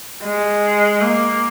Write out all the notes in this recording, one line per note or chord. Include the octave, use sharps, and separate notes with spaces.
G#3
A#3